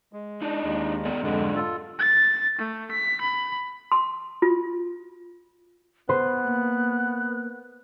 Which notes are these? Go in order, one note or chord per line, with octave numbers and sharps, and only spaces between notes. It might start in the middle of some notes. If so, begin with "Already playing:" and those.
G#3
D4 D#4
D#2 G#3
B3 A4 D5
F2 G#2 D3 G#3 D4
F4 A4
A6
A3
B6
B5
C6
F4
B3 B4 C5 C6 F#6
A#3